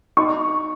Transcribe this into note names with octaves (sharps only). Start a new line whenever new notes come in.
D#4 C#6